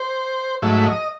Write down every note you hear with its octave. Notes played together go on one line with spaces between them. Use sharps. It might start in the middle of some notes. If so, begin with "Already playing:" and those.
Already playing: C5
G#2 F#3 A3 E5
D#5